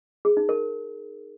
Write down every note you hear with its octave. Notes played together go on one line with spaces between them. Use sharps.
G#4
D#4
A#4